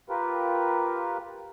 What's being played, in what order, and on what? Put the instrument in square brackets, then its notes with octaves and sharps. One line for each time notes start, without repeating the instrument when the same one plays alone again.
[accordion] F4 G4 A#4 B4